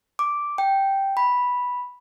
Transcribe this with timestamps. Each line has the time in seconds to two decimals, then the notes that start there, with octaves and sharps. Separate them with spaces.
0.19 D6
0.58 G5
1.17 B5